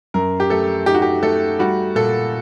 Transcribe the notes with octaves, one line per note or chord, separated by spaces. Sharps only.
F#2 A#4
G4
A3 A4
D#4 G4
F#4
G4
A3 A4
G3 F#4
A#2 A4